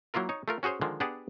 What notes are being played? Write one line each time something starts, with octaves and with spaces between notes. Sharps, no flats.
F#3 A#3 E4 F4 A#4
D#4 C#5
A3 F4 A#4
C#4 F#4 G#4 C5 C#5
D3 D#3 F3 G#3
B3 D4 G4 G#4 D5 F#5